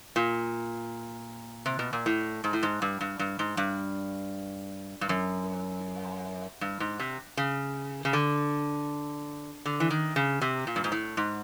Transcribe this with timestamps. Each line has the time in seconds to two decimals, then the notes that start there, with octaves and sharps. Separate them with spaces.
0.16 A#2
1.66 C3
1.79 B2
1.93 A#2
2.06 A2
2.44 G#2
2.53 A2
2.63 G#2
2.82 G2
3.01 G2
3.19 G2
3.39 G#2
3.57 G2
5.01 G2
5.09 F#2
6.61 G2
6.80 G#2
6.99 C3
7.37 C#3
8.05 C#3
8.13 D3
9.66 D3
9.80 E3
9.90 D#3
10.16 C#3
10.41 C3
10.67 A#2
10.76 G2
10.84 G#2
10.92 A2
11.17 G#2